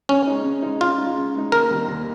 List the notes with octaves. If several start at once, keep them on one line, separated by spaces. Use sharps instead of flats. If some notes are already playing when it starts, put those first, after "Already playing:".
C#3 C#4
G#3 D#4
C#3
G#3 D#4
C#3 F4
G#3 D#4
C#3
G#3 D#4
D#2 A#4
D#3 G3 C4
D#2